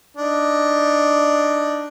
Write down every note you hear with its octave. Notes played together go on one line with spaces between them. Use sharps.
D4 D#4